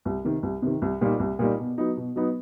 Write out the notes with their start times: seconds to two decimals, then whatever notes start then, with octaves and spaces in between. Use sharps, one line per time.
0.05 C2
0.25 C3 D#3
0.43 C2
0.62 C3 D#3
0.82 C2
1.01 A#2 G3 A#3 D#4
1.20 C2
1.39 A#2 G3 A#3 D#4
1.59 B2
1.78 F#3 B3 D#4
1.97 B2
2.16 F#3 B3 D#4